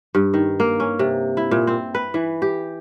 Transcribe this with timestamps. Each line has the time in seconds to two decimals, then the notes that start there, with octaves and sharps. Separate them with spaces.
0.15 G2
0.34 D#3
0.60 A#3
0.80 C#4
0.99 C3
1.37 E4
1.51 A#2
1.67 C4
1.95 B4
2.14 E3
2.42 G4